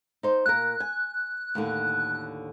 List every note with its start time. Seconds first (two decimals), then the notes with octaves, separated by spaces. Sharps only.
0.23 D#4 C5
0.46 A#2 A#4 F#6
0.80 G#5
1.55 D#2 A2 D3